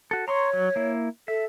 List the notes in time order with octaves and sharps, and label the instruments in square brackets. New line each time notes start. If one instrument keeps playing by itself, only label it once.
[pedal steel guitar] F#4 A4
[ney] C#5 [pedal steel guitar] A#5 C6 C#6
[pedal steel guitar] F#3
A#3 E4
[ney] A4 [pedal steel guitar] E5